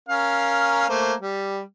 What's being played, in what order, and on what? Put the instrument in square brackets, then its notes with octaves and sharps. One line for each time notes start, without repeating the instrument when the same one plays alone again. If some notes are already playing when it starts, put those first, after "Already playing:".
[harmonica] C#4 A#4 F5
A3 A#3 C5
G3